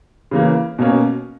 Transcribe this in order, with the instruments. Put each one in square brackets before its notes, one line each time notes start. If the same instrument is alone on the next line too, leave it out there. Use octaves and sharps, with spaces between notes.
[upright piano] C#3 E3 A#3
B2 A#3 C#4